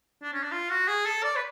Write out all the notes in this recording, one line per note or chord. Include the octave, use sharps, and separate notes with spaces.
D4
C#4
D4
F4
F#4
G#4
A4
D5
B4